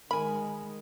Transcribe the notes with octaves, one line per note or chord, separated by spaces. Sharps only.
D#3 G#3 A#4 G#5 B5